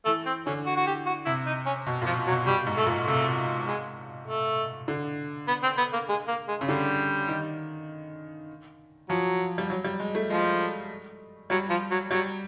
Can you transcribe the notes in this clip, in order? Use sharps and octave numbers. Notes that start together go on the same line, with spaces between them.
E3 A3
C4
D3 C#4
F#4
F#4
G4
F#4
C3 E4
D#4
C#4
B2
A#2
F3
F#3
B2
B2 G3
G#2
A3
A#2
C3 A3
G#3
A3
D3
B3
C4
B3
A#3
G#3
A#3
G#3
C#3
D3 G3
D#3
F3 F#3
G3
F#3
G3
G#3
A3
F3 G#3
F#3 G3
F3
F#3
F#3 G3